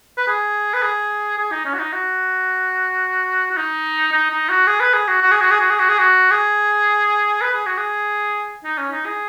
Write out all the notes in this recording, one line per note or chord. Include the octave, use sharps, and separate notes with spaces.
B4
G#4
B4
G#4
G#4
D#4
C#4
F#4
D#4
F#4
F#4
D#4
D#4
D#4
F#4
G#4
B4
G#4
F#4
F#4
G#4
F#4
G#4
F#4
G#4
F#4
G#4
F#4
G#4
B4
G#4
F#4
G#4
D#4
C#4
D#4
G#4